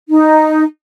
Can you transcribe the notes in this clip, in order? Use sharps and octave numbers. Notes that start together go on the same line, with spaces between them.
D#4